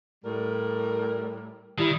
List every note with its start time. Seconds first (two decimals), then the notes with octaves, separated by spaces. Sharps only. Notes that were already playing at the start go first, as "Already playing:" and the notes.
0.25 A2 G3 A#4
1.79 D#3 G3 E4